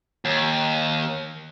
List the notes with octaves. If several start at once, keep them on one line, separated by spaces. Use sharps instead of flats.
D#2